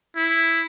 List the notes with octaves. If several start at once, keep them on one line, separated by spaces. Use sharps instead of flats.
E4